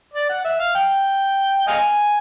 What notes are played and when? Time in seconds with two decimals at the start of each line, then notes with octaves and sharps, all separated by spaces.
0.13 D5
0.29 F#5
0.44 E5
0.59 F5
0.75 G5
1.67 D#5 F5 G#5